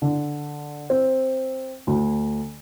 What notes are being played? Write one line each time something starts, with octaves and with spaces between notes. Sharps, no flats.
D3
C4
D2